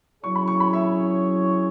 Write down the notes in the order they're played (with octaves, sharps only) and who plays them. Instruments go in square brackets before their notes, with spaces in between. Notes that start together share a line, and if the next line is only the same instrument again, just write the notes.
[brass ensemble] F#3 C#4 E4 G#4 C#5 [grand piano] C#6
[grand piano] B5
C#6
B5
E5